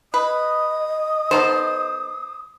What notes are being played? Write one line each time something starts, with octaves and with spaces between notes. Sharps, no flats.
B4 D#5 D#6
B3 D#4 A4 C5